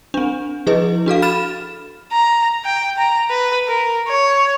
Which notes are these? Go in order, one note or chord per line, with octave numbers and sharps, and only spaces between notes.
C4 D4
F3 E4 G#4 B4 D#5
D4 F#4 A4 F5
B5 F6 A6 E7
A#5
G5
A#5
B4
A#4
C#5